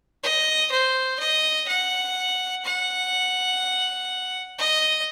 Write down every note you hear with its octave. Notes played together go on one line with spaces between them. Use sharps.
D#5
C5
D#5
F#5
F#5
D#5